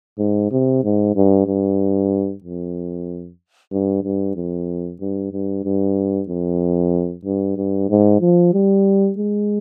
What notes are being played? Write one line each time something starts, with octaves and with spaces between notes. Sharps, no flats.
G#2
C3
G#2
G2
G2
F2
G2
G2
F2
G2
G2
G2
F2
G2
G2
G#2
F3
G3
G#3